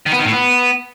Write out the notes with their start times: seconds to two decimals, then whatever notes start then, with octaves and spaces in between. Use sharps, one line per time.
0.06 D#3
0.13 B3
0.19 D#3
0.26 A2
0.32 B3